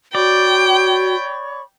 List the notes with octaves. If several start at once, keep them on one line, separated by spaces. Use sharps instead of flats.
F#4 C#5 D5 G5 B5 C#6